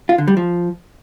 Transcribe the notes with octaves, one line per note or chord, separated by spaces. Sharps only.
F4
D3
G3
F3